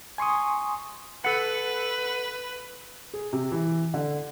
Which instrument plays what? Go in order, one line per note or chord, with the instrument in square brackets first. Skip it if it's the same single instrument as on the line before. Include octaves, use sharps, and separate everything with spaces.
[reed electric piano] G#5 C6 C#6 D#6
[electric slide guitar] A4 F#5 [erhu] B4
[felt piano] G#4
C3
E3
D3